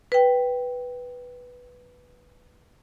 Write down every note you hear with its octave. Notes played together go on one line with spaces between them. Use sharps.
B4 G5